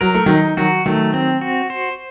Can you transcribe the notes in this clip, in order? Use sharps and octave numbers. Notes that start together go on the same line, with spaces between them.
F#3 A#4
A3
D#3 F#3 D#4
D#3 F#3 F#4
D#3 F#3 A3
C4
F#4
C5